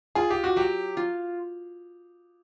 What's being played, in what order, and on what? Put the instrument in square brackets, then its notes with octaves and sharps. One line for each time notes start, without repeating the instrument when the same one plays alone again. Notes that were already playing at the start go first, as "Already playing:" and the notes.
[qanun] F4 [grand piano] G#4
[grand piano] G4
F#4
[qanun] F#3 [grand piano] G4
[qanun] F4